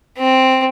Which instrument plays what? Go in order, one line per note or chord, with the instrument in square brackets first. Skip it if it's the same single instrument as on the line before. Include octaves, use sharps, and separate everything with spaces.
[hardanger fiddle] C4